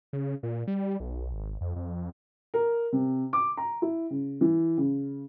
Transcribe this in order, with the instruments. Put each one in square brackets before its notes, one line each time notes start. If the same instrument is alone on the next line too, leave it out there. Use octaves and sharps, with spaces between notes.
[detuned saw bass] C#3
A#2
G3
B1
G#1
F2
F2
[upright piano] A#4
C3
D6
A#5
E4
C#3
E3
C#3